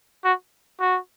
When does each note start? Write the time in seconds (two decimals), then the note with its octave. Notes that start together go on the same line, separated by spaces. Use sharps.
0.24 F#4
0.80 F#4